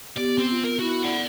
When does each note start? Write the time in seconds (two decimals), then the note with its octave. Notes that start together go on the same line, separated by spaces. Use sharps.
0.17 B3 G4 D5
0.38 C4
0.51 F4
0.64 A#4
0.80 E4 F#4
1.04 D5 F#5